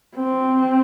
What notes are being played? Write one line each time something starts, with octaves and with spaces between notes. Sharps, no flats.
C4